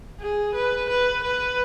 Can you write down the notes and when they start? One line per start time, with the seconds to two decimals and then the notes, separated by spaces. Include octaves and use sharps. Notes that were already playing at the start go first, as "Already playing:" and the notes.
0.20 G#4
0.55 B4
0.90 B4
1.24 B4